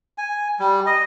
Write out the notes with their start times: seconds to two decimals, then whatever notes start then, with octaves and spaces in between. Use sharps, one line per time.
0.18 G#5
0.60 G3
0.87 D#5